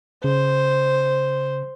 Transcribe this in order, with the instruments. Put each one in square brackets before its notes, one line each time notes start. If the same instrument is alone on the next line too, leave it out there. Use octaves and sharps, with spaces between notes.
[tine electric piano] C#3 [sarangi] C5